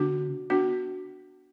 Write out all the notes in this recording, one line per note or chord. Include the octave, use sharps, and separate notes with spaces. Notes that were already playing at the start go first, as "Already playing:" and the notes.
Already playing: D3 B3 D4 F#4
B3 D4 F#4